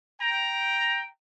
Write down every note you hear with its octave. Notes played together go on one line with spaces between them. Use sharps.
G5 A#5